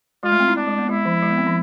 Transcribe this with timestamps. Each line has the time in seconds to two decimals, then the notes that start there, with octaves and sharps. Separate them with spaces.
0.23 G#3 F4
0.32 A3
0.40 C4
0.48 E4
0.56 C4 D4
0.67 G#3
0.78 B3
0.89 G#3 E4
1.05 F3
1.23 G#3
1.30 B3
1.38 C4
1.47 F3